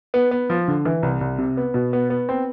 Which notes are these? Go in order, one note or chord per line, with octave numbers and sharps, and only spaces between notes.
B3
B3
F3
D3
E3
C2
C2
C3
B3
B2
B3
B3
C4